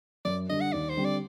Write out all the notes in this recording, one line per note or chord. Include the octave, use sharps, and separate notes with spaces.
F#2 D5
D3 G3 D4 D#5
F#5
D#2 D5
C5
D3 G3 C4
D5